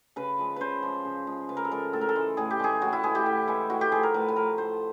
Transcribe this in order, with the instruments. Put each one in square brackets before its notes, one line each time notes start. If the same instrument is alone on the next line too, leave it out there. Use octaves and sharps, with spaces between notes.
[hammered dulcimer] C#3 B4
F3 G#3
C#3 B4 C5
F3 G#3
C#3
F3 G#3
C#3 B4
A#4
A4
F3 G#3 A#4
A2 A4
A#4
A4
E3 G#3
A2 G#4
G4
E3 G#3 G#4
A2 F#4
E4
E3 G#3 G#4
G4
A2
E3 G#3
A2 F#4
G4
F3 A3 G#4
A#4
A2 B4
B4
F3 A3 A#4
A2 C5